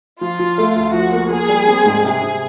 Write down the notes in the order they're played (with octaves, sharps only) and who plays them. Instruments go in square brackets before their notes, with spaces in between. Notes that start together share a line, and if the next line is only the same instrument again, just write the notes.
[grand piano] F3 [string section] F4
[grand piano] F3
A3
D2
[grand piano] F3 [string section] F#4
[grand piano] A#3
[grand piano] A#3 [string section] G#4
[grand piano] G3
C4
G#2
[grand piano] C3 [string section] G#4
[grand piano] C3